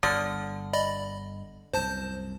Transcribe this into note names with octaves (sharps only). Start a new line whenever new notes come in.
G1 D3 D#6 F6
D5 D#5 B5
C2 F#2 C5 A5 G6